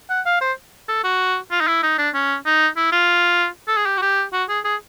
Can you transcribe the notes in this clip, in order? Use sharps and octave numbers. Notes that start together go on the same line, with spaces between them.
F#5
F5
C5
A4
F#4
F4
D#4
E4
D#4
D4
C#4
D#4
E4
F4
A4
G#4
G4
F#4
G4
F#4
G#4
G#4